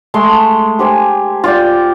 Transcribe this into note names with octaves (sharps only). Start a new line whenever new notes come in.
G#3 A3 C6
G4 C5 G#5
F4 D5 G5